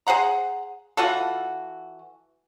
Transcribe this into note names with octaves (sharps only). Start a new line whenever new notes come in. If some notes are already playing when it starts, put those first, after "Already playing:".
G#4 C5 F#5 A#5
E3 F4 F#4 A4